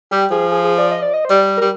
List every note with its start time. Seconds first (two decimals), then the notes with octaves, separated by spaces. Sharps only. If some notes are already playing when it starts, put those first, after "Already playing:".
0.11 G3 G4
0.31 F3 G#4
0.52 G#4
0.64 G#4
0.78 D5
0.91 D#5
1.02 D5
1.14 D#5
1.25 C5
1.30 G3 D5
1.57 A#4
1.62 G3